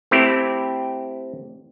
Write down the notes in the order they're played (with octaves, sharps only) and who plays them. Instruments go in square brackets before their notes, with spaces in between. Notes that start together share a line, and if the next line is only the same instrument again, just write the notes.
[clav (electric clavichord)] A3 C4 E4 G4